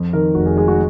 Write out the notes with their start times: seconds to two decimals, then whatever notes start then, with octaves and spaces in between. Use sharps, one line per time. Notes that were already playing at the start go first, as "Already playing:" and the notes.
Already playing: F2
0.13 D#3 A#4
0.35 F1 F#4
0.46 G#4
0.57 G#3 G#4
0.68 F#4